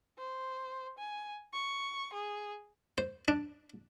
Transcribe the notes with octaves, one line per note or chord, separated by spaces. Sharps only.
C5
G#5
C#6
G#4
C5
D4